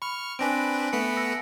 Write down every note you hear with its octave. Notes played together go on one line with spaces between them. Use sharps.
B5 C#6 F6
C4 D4 B4 G#5 A#6 D7
A3 B3 B4 C#7
E6 A#6 C#7